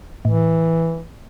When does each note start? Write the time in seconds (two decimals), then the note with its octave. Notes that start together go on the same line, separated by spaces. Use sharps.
0.25 A2 E3